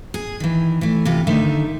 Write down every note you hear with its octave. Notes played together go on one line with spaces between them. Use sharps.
G#4
D#3 E3
E3 A3
C3 E3 F4 A4
D3 D#3 A3 D#4 E5